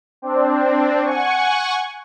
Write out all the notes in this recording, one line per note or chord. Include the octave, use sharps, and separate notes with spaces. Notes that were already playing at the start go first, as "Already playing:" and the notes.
C4 D4
F#5 G#5 C#6